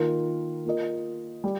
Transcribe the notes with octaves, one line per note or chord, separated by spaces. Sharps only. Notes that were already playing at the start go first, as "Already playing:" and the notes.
Already playing: D#3 A#3 F4 A#4
A#3 F4 A#4 D#5
G3